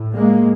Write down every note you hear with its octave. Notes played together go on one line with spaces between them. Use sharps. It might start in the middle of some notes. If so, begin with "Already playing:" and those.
Already playing: A2
G#3 A#3